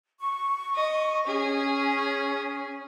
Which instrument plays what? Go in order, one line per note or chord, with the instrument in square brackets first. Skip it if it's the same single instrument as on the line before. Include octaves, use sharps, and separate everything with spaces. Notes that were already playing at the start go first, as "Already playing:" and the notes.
[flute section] C#6
[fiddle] D#5
[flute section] C#4 [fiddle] G#4